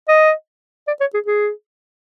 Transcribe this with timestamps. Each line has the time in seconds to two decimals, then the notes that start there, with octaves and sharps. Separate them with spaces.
0.08 D#5
0.87 D5
1.00 C#5
1.14 G#4
1.26 G#4